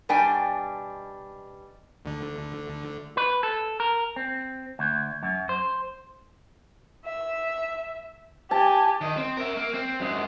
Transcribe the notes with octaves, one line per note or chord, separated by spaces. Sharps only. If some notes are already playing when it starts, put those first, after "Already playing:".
B2 G3 D4 G5 G#5
D2 D3
B4
A4
A#4
C4
D2
F#2
C5
E5
G4 G#5 A5
D#3 D#5
C4
A#4 E5
A#3
C4
F#2 G#3